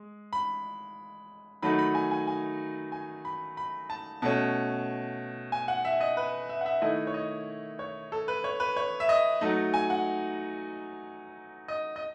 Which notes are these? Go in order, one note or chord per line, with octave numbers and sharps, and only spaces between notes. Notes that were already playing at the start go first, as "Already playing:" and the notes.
Already playing: G#3
B5
D#3 F#3 A3 D#4 B5
B5
G#5
G#5
G#5
G#5
B5
B5
A5
B2 A3 C#4 A5
G#5
F#5
E5
D#5
B4
E5
F#5
E5
D#3 A3 E4 D#5
C#5
D#5
C#5
A4
B4
C#5
B4
C#5
E5
D#5
F#3 A3 D#4
G#5
F#5
D#5
D#5